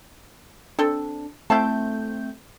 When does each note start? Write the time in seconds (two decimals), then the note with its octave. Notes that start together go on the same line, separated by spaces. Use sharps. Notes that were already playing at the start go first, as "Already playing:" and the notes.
0.79 C4 D4 A4
1.50 A3 C4 E4 F5 A5 G6